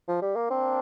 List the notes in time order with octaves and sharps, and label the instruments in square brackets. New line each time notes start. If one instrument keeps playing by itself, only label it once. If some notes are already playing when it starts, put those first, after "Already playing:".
[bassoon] F3
G3
A#3
[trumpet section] A#3 D4 [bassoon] C4